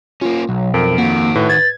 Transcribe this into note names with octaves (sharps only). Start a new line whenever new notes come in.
A#3 C#4 F4
B1 F#3
F2 A#4 D7
D#3 A#3 F#4
A2 B4
G#6 A6